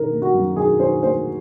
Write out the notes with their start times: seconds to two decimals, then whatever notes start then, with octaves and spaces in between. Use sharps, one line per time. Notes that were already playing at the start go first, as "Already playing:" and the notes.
Already playing: D#3 D#4 A#4
0.11 A#3
0.22 F#4
0.34 F#2
0.56 D#3 G#4
0.80 D#4 C5
1.02 A#3 C5